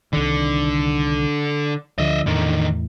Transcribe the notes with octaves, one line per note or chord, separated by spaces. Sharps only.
C2 D3 D#3
D2 D3 F3 D#5 E5
E2 A2 D3 D#3